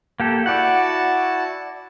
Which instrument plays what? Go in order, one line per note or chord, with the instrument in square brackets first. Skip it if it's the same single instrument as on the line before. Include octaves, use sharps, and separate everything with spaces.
[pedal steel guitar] A#3 G4 A4
[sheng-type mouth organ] E4 F#4 A5 [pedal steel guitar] D5 F#5